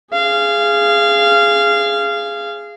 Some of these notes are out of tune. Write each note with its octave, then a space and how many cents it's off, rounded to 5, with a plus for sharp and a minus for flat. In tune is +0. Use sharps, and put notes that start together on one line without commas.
G#4 +0 F5 -20